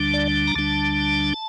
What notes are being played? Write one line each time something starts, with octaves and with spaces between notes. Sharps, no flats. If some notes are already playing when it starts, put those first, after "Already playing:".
Already playing: D2 D3 G3 D4
D5
A#5
D2 D3 G3 D4 A5